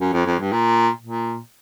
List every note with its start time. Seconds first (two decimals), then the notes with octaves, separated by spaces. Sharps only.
0.01 F#2
0.13 F2
0.26 F2
0.40 G2
0.52 A#2
1.02 A#2